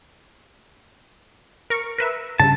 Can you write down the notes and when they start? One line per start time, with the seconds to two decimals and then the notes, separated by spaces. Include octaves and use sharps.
1.70 A#4 C#6
1.98 A#4 B4 E5
2.40 G2 C#3 A5